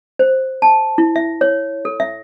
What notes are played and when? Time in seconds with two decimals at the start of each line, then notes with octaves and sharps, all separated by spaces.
0.19 C5
0.62 A5
0.98 E4
1.16 E5
1.41 C#5
1.85 A4
2.00 E5